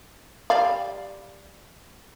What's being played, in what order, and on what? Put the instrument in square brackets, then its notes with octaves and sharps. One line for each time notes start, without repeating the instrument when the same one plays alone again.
[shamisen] G3 D5 F5